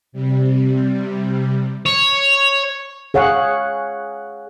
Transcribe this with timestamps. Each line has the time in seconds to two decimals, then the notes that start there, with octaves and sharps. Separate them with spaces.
0.12 C3 G3
1.86 C#5
3.14 G#4 C#5 F5 F#5